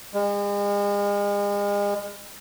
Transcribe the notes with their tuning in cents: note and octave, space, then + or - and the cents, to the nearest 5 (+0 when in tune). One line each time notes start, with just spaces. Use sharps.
G#3 -40